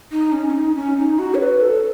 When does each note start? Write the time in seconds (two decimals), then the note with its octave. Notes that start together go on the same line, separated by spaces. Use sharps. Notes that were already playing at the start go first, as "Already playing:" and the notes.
0.12 D#4
0.32 C#4
0.49 C#4
0.55 D#4
0.75 C#4
0.97 D#4
1.19 F#4
1.35 C#5
1.40 B4
1.61 A4